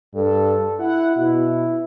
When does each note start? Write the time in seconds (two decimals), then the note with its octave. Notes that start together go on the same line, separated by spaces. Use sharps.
0.14 G2 A4
0.79 E4 F#5
1.17 B2 E4